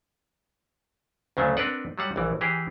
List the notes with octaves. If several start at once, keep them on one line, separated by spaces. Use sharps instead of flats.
D2 C#3 F#3 A3
C4 D4 A#4 B4 D5 F#5
F#3 G3 F#5
A#1 E3
E3 G4 G#4